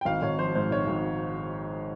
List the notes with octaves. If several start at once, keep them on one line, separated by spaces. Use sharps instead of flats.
G5
G#1 F5
G#1 C#5
F3 C5
G#2 C5
G#1 C#5
G#1